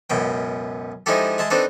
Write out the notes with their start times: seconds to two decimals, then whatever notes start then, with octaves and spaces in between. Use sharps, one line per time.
0.10 C#2 F#2 B2 G5
1.06 F3 G#3 D#4 E4 G4 A4
1.38 G#3 E5 A5 C6
1.50 C4 D4 D#4 A4 B4 C5